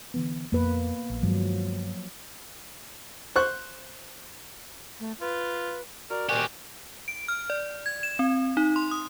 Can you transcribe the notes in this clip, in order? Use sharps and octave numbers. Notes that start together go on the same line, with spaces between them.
D3 E3 B3
F2 A#3 B3 B4
A#1
G2 D#3 F3 F#3 G#3
C5 C#6 F#6
A3
F4 B4
F#4 A#4 D5
A#2 F#4 G4 A#4 G#5
D7
F6
D5
G#6
E7
C4
D#4
C6
D#6